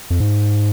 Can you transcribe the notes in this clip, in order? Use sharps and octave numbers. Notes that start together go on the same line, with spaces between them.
F2
G#2